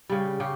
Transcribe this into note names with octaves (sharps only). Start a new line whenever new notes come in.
C#3 G3
C#3 G4